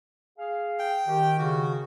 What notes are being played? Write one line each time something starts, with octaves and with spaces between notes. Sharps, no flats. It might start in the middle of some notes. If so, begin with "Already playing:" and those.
G#4 F5
G5
D#3 G4
C#3 F#4